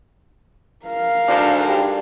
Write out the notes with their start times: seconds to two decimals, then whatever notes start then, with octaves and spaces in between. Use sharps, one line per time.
0.86 A#4 F5
1.28 D2 G#2 D4
1.67 G3